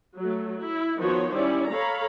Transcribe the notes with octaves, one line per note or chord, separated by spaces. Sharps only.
F#3 A3
E4
D#3 F3 B3 F#4 C5 C#5
G3 C#4 E4 D5
A4 C#5 F5 A#5 B5